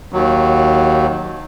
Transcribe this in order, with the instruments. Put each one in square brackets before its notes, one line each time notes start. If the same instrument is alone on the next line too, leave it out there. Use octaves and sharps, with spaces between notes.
[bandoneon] D#2 F#3